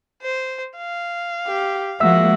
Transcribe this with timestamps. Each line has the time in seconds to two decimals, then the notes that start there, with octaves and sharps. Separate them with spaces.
0.22 C5
0.77 F5
1.47 G4
2.00 F3 G#3 A#3 F#4 E5 F#5 E6